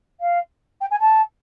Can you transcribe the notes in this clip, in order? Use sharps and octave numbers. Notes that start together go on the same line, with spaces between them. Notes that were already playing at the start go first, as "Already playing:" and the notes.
F5
G5
G#5
A5